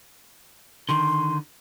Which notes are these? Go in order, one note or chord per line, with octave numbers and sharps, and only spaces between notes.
D3 D#3 C6